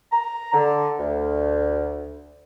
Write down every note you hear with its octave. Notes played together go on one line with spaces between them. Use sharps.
A#5
D3
D2